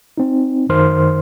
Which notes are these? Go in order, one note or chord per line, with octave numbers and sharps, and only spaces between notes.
C4 D#4
F#2 D#3 C5 C6 F6